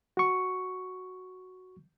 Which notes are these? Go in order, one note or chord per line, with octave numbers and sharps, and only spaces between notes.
F#4 C#6